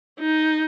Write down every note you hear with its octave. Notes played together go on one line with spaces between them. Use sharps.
D#4